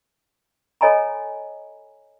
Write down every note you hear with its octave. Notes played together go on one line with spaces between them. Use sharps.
A4 C#5 D#5 G#5 A#5 B5